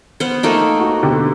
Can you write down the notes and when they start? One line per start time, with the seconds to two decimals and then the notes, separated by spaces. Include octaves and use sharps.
0.20 B3 C5
0.43 A3 A#3 D#4
0.80 F#4
1.03 B2 D3 G4